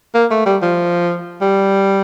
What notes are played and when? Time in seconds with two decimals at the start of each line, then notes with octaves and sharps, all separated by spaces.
0.14 A#3
0.31 A3
0.46 G3
0.62 F3
1.41 G3